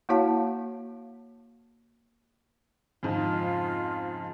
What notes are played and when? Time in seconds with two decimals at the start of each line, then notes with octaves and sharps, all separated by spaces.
0.09 A#3 E4 F#4 C#5 F5 A5
3.03 F2 G#2 C#3 F4